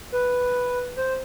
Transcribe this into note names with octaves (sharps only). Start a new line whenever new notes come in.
B4
C5